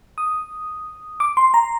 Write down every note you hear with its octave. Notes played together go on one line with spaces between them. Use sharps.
D#6
D6
C6
A#5